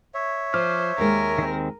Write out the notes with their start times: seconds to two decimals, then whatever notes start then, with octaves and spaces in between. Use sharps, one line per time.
0.14 C#5 E5
0.54 F3 C5 D6 F6
0.98 D#2 G#3 A#4
1.38 D#3 C4